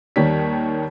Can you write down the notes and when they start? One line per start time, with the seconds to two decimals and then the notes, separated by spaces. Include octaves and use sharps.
0.16 D#2 D#3 G3 A#4 C#5 B6